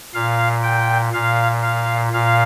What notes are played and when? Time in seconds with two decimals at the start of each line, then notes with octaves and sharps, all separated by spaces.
0.14 A#2 F5
0.63 G5
1.13 A#2 F5
1.62 F5
2.13 A#2 F5